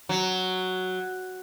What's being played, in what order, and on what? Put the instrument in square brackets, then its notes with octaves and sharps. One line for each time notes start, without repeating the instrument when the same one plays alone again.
[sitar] F#3